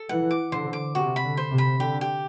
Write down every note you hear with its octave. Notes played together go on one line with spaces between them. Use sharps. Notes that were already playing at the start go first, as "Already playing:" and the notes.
Already playing: A4
E3 F#5
D6
D3 C5
D6
C3 F#4
B5
D3
C5
C3
B5
D3 G4
G4